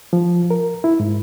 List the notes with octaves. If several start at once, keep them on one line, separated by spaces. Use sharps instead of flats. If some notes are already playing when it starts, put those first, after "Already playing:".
F3
A#4
E4
G#2